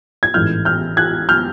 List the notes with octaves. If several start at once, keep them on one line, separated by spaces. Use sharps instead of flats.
G#6
A1 G#2 E3 A3 F6 G6
F6 G6
F#6 G#6
F6 G6